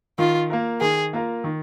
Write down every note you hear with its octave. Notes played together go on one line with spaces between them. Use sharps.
D#3 F4
A#3 F4 A#4
D#3 G#4
A#3 F4 A#4
D#3